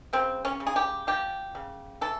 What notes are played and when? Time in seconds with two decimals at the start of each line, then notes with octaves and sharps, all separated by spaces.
0.13 C#3 C4
0.45 C#4
0.60 C#3
0.67 G#4
0.76 G4
1.07 F3 G4
1.55 C#3
2.01 E3 A4